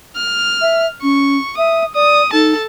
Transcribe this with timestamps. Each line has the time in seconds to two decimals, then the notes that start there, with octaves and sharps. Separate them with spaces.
0.16 F6
0.61 E5
1.03 C#4 C#6
1.58 E5 D#6
1.95 D5 D#6
2.33 D#4 A4 A5